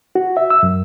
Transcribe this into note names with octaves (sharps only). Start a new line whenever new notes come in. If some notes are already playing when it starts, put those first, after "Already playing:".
F#4
E5
E6
F#2